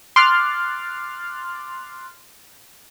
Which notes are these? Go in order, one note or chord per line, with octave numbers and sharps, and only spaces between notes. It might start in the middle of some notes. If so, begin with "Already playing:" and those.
C6 D6 F6 F#6 A6